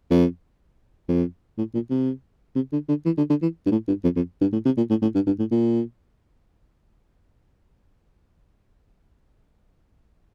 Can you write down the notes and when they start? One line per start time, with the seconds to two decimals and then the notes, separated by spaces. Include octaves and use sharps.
0.11 F2
1.08 F2
1.58 A2
1.74 A#2
1.90 C3
2.55 C3
2.73 D3
2.89 D3
3.06 E3
3.17 D3
3.30 D3
3.42 E3
3.66 G2
3.71 A2
3.88 G2
4.04 F2
4.16 F2
4.41 G2
4.53 A2
4.65 C3
4.77 A#2
4.90 A2
5.02 A2
5.15 G2
5.27 G2
5.39 A2
5.51 A#2